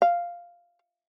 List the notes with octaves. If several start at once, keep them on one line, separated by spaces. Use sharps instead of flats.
F5